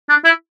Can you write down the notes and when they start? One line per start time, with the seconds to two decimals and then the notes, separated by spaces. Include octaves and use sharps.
0.09 D4
0.25 E4